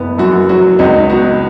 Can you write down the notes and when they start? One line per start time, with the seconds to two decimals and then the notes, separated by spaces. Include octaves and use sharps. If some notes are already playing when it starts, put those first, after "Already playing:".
Already playing: F#1 B3
0.18 F#2 F#4
0.49 F#3 F#4
0.79 C#2 D#4
1.10 B3 F#4